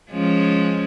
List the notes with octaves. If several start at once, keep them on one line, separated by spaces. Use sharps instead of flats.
F3 G#3 C#4